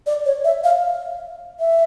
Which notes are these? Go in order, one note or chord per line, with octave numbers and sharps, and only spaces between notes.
D5
C#5
E5
F5
E5